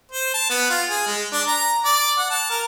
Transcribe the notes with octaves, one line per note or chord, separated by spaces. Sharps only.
C5
A5
B3
F4
G#4
G#3
D4
A#5
D5
F#5
A5
A#4